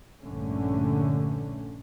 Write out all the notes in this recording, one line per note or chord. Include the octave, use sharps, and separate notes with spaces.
A#1 G2 D3 A3 C#4